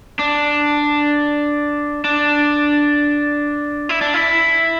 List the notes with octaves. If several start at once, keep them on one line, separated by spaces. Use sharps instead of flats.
D4
D4
E4
D4
E4